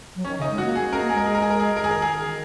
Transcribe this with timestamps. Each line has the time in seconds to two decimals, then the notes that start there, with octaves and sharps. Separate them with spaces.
0.15 F#3
0.25 D#3 C#4
0.37 C#3 D#4
0.50 G#3
0.58 F#4
0.63 A#3
0.76 G#4
0.89 C#4 A#4
1.01 A#3
1.09 G#4
1.13 G#3 A#4
1.26 G#4
1.35 A#4
1.42 G#4
1.50 A#4
1.60 G#4
1.77 D#3 A#4
1.84 G#4
1.91 A#4
2.02 G#4
2.27 D#3